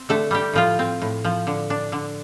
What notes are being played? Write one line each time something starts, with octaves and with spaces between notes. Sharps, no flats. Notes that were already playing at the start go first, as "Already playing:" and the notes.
Already playing: C4
D3 A3 A4
G3 A3 G4
A2 F3 F4
C4
A2
F3
D3
D4
D3